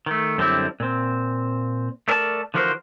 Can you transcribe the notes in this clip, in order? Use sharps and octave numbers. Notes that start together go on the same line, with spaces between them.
D#3 A3
F#2 D3 G3 C4 E4
A#2 C4
A3 D4 A#4 D5 A5
D3 E3 F3 F#4 A#4 C5